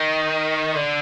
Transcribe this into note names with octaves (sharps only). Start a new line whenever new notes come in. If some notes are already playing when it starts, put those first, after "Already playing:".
Already playing: D#3
D3